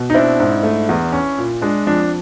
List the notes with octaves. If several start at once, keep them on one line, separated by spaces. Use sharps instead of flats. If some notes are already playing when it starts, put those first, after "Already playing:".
Already playing: B2
D#4
C4 D4 E4
G#2
A3
E2
C#4
A#2
G#3 D4
F2 D4